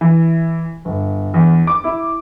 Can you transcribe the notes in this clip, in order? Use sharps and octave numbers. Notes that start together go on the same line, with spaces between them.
E3
G1
E2
D6
E4